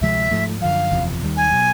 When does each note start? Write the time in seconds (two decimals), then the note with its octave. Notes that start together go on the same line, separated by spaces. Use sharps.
0.01 D2 C3 F3 G#3 E5
0.31 G#2 F3 A3
0.61 F#2 D3 F3 F5
0.91 F#1 E2 C3 F3
1.22 D#2 D#3 G3
1.36 G#5
1.51 B2 F#3